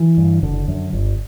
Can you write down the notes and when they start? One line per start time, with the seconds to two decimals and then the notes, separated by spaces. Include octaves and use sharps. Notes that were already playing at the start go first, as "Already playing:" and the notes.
Already playing: E3
0.17 G2 D3
0.43 F#1 D3
0.68 F#2 D3
0.93 G1